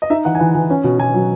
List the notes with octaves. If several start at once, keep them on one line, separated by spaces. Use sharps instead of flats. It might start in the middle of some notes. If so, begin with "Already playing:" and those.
D#5
D#4 E5
E3 F#5
G#5
E3 F#5
E3
C#4
B2
B2 G#5
F#3